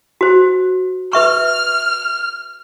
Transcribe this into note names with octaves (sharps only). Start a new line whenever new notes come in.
F#4 C5
B4 E5 C#6 F6